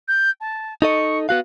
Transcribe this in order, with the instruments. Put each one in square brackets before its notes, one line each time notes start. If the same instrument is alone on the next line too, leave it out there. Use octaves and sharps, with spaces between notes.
[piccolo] G6
A5
[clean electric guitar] D#4 A4 D#5 [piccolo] C#6
[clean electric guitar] B3 F#4 F5 [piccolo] F#6